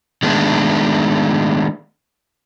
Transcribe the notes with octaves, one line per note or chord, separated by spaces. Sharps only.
D#3 G#3 A3 B3 D4